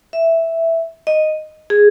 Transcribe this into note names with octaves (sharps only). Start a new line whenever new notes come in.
E5
D#5
G#4